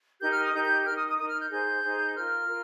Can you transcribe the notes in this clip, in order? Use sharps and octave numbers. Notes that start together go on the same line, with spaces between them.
D#4 G4 A#4 G6
F6
D#6
D#4 G4 A#4 G6
G6
D#4 A#4 F6
D#6
D#6
D#4 A#4 D#6
F6
G6
D#4 G#4 C5 G6
D#4 G#4 C5
F4 A#4 F6
F4 A#4